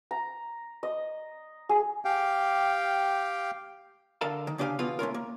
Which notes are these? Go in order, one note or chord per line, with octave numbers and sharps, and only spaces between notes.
A#5
D#5
G#4
G4 F5 G5
D3 A#4 F5 A5
D#3
C#3 D4 G4 B4 F5 G#5
E2 B2 B3 F4 F5
A3 C#4 F4 A#4
A#3